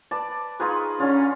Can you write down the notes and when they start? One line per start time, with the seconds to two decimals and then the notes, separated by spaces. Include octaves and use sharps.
0.11 B4 D5 A5
0.60 D#4 F4 G#4 B4 C6 C#6
1.00 D3 C#4 F4